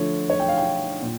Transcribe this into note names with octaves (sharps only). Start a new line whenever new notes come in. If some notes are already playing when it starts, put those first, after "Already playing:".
Already playing: D3 F3 A3 C#5
C#5
G5
F5
G5
A#2